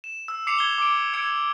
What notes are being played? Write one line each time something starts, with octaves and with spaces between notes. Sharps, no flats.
E7
E6
D6 C7 C#7 F7
G#6 G7
D6 D7
E6 G#6 C#7 D7